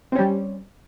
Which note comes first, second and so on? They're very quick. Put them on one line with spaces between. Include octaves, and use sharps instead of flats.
C4 C#4 G3